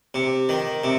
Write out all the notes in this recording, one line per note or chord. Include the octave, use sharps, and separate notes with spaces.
C3
D#3
C3